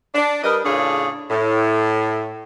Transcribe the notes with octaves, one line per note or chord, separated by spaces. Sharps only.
D4
G3 A#4 B4 D#5
A2 C#3 D4 F4 G#4 C#5
A2